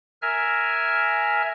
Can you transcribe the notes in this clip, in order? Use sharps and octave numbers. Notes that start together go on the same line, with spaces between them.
A#4 E5 G#5 F6